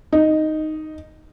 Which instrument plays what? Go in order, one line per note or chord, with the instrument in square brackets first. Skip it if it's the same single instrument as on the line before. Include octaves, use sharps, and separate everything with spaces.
[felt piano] D#4